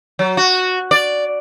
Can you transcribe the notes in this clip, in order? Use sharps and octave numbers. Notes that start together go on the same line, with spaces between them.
F#3
F#4
D5